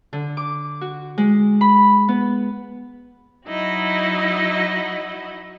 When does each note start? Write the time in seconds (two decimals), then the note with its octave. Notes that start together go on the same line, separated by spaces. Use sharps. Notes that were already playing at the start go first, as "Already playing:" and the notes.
0.13 D3
0.37 D6
0.81 F#4
1.18 G#3
1.61 B5
2.08 B3
3.48 F#3 D#4 E4 F#4 D#5